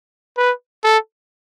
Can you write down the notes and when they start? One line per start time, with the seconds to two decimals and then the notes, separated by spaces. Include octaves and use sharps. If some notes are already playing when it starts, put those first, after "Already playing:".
0.37 B4
0.84 A4